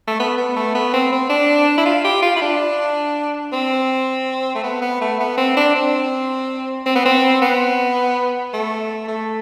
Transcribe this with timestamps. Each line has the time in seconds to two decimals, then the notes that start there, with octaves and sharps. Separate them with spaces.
0.07 A3
0.19 B3
0.38 B3
0.56 A3
0.74 B3
0.93 C4
1.12 C4
1.30 D4
1.77 E4
1.85 F4
2.04 G4
2.22 F4
2.36 E4
2.42 D4
3.52 C4
4.55 A3
4.63 B3
4.82 B3
5.01 A3
5.20 B3
5.37 C4
5.56 D4
5.75 C4
6.86 C4
6.95 B3
7.05 C4
7.42 B3
8.53 A3
9.08 A3